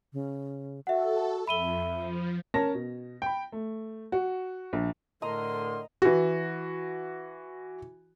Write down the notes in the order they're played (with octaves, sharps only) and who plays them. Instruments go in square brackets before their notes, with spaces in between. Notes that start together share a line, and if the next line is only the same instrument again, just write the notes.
[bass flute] C#3
[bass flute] F#4 [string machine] A4 [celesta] E5 F#5
[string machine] F2 [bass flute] E5 [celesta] B5 D#7 G7
[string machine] F3
[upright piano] C#4 A#4 A5 A#6
B2
G5 B5
A3
F#4
A#1
[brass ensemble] A2 D3 [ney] A#4 [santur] D#5 A#5 [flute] C6
[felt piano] E3 F#4